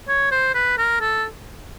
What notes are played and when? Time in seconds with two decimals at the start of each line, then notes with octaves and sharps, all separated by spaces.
0.08 C#5
0.31 C5
0.54 B4
0.78 A#4
1.01 A4